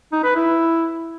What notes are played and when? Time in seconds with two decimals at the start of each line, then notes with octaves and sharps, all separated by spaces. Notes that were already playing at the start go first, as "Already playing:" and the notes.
0.12 D#4
0.24 B4
0.35 E4